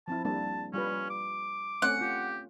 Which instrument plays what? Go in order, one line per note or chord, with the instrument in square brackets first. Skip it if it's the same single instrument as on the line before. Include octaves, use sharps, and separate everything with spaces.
[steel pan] F3 C4 E4 [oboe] A5
[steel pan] G3 A#3 D4 [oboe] A5
[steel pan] G3 F4 B4 [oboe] C#4
[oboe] D6
[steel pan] A3 C4 C#4 [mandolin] F#5
[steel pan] F4 [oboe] G4